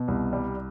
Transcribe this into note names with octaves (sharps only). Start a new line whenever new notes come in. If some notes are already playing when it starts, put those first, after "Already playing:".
Already playing: B2
C2
G3